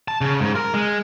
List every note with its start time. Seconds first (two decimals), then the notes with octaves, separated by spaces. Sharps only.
0.08 A5
0.21 C#3
0.41 G#2
0.56 A#4
0.74 G#3